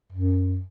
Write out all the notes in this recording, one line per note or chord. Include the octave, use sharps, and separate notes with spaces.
F#2